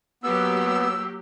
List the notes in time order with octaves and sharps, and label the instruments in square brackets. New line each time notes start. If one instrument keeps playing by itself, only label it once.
[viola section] F#3 A#3 G4 [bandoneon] B3 [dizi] E6